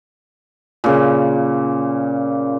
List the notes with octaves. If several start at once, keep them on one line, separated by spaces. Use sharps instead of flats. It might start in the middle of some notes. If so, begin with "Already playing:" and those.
A#2 C#3